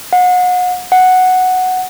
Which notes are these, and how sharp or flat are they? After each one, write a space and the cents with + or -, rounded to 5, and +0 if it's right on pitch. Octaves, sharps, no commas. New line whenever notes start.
F#5 -35
F#5 +0